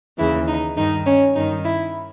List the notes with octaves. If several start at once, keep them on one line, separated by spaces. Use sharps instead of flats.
D#2 C#3 E3 E4
D#4
G2 D#3 D#4
C#4
G2 D#3 D#4
E4